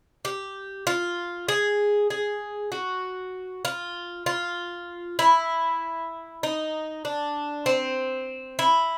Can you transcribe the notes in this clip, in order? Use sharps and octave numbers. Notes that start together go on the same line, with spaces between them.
G4
F4
G#4
G#4
F#4
F4
F4
E4
D#4
D4
C4
E4